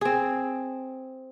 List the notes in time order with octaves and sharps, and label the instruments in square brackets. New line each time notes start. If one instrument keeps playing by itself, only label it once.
[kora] C4 G#4